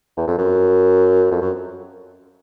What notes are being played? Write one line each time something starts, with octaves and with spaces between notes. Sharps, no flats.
E2
F2
F#2
F2
F#2